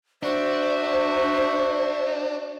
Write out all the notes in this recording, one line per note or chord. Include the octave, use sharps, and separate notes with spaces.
D4 F#4 C5 E5